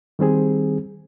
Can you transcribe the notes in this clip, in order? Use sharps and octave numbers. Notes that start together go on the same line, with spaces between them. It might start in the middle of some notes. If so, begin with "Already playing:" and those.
D#3 G3 C4 G#4